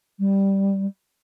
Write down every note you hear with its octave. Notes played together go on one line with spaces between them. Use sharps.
G3